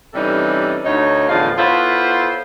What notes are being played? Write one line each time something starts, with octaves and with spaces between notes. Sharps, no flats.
C3 E3 G3 C#4 D#4 A4
D2 D#4 C#5
E2 A2 D3 F3 F4 F5
B3 E4 F4 A4 C5 C#5